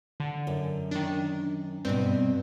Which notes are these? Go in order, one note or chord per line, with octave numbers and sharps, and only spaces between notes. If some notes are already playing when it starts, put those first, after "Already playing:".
D3
F#2
D#3 D4
G2 B2 C4